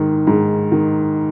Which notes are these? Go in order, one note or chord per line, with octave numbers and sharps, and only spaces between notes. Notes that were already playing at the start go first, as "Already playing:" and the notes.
Already playing: G#2 D#3
G#2
D#3